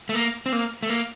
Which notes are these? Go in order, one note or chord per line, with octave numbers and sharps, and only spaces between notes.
A3
A#3
C4
A#3
A3
A#3